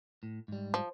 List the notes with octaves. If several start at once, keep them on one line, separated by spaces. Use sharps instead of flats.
A2
G#2 G3
F3